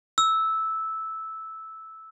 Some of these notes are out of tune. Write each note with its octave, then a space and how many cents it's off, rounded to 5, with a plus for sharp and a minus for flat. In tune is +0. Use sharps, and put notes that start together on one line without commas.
E6 -10